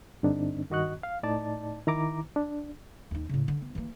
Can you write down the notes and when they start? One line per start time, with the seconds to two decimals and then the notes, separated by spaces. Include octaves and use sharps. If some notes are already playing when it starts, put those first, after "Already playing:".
0.23 G2 D3 C4 D4 D#4
0.70 G2 D#3 F#4 D#5 C#6 F#6
1.03 F5
1.23 A2 D#4 D5 A5
1.87 D#3 E4 A#5 D6
2.36 D4
3.11 D#2 D#4
3.29 A2 C#3
3.48 D3
3.62 B3
3.75 E3 A#3